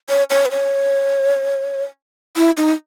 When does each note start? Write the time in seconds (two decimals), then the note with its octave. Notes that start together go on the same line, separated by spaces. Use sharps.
0.09 C#5
0.30 C#5
0.46 B4
0.51 C#5
2.36 E4
2.57 D#4